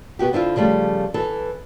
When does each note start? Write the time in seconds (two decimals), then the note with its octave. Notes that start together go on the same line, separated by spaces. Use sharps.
0.19 B2 B3 F#4 G4
0.33 D3 C4 E4 F4
0.56 C#3 F3 G3 A3 C#4
1.14 E3 A4